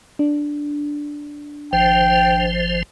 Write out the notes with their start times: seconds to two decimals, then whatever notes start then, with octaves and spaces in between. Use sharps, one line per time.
0.19 D4
1.73 G#1 F3 C5 G5